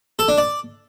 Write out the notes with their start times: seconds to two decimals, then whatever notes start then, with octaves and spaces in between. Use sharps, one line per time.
0.19 A4
0.28 D4
0.38 D5